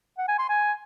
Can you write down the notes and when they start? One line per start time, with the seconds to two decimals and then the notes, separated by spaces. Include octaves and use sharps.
0.18 F#5
0.28 G#5
0.39 C6
0.49 G#5